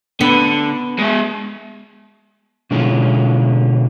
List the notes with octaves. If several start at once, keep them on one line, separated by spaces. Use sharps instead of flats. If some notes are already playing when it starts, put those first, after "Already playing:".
D3 B3
G#3 E5
B2 D3 G#3 C#4 E4 F4